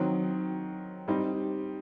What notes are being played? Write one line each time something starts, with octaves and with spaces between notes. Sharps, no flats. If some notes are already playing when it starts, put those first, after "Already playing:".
Already playing: D#3 F#3 C4
G3 C4 D#4